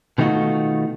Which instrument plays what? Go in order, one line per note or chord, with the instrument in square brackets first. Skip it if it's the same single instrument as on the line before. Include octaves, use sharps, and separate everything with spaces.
[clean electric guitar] B2 D#3 A3 D#4 F4 F#4